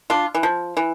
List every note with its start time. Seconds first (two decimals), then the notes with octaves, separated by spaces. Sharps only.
0.10 D4 F4
0.35 E3
0.43 F3
0.77 E3